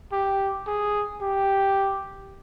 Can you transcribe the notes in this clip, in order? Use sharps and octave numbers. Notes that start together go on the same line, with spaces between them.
G4
G#4
G4